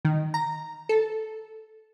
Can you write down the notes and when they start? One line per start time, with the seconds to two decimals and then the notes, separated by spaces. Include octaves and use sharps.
0.05 D#3
0.34 A#5
0.89 A4